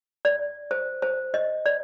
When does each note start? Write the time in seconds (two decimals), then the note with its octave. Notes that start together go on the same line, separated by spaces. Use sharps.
0.25 D5
0.71 C5
1.02 C5
1.34 D#5
1.66 D5